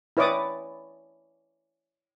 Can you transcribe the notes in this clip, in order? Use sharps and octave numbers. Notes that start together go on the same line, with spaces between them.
E4 B4 C#5 D5 D6 D#6